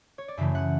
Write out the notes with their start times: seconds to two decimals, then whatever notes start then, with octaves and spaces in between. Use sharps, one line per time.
0.18 C#5
0.28 D5
0.37 F#2 C#3 E3 A3 E5
0.55 F#5